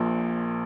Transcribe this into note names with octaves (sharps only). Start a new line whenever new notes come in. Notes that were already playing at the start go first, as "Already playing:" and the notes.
Already playing: A#1 A#2 F3